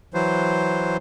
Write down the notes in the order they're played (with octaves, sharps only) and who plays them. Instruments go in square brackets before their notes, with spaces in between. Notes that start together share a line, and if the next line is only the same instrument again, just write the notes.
[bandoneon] E3 F#3 C5